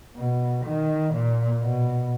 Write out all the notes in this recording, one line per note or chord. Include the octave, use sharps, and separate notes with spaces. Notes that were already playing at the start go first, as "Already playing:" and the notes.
B2
D#3
A#2
B2